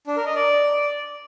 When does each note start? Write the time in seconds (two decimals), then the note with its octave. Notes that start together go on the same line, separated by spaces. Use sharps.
0.07 D4
0.17 A#4
0.26 D#5
0.36 D5